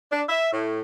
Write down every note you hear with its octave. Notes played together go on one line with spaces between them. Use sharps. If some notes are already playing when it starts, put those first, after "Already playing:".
D4
E5
A2